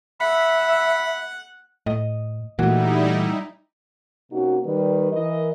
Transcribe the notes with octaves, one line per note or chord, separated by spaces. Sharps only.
E5 F#5 B5
A2 D#5
A#2 E3 G3 A3 D#4 E4 F#4
C3 A#3 C#4 D#4 F#4
D#3 G3 B4
E3 A#4 D#5